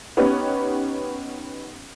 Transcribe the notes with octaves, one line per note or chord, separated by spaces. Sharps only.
B3 C#4 D#4 G4 B4